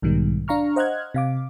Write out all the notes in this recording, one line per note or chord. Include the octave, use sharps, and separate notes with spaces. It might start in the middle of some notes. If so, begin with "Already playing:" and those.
B1 G#2 B2 D#3 G3
D4 F5 A#5 C#6 F6
C5 D#5 F#5 F6 F#6 G#6
C3 F5 D6